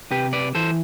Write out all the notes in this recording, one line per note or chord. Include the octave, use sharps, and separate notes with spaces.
C3 G4 B4
B4 D5
E3 A4 C5